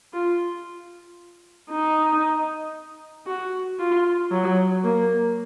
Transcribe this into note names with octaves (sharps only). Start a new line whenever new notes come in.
F4
D#4
F#4
F4
F#3
A#3